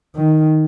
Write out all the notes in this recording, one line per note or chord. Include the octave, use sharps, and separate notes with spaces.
D#3